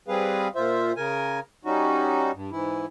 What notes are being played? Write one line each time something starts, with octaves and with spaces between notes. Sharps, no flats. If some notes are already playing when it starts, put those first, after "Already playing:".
G3 C4 G#4 B4 F5
A#2 F4 C5 E5
C#3 A#4 G#5
G3 C#4 D#4 F#4
G2
G#2 E3 E4